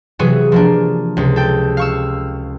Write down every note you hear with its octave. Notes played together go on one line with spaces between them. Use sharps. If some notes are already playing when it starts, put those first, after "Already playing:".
C3 E3 F#3 B3 F#4 G#4
F3 A#3 D4
C#2 C3
A4 G5
F5 C#6 E6